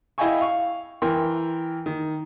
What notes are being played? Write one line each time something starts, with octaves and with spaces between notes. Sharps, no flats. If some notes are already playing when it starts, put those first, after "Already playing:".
E4 D#5 F5 G5 G#5 C#6
F5 C#6
E3 A#4 G5 C6
D#3